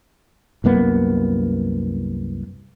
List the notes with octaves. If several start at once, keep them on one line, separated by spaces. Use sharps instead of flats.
C2 F#2 A#3 B3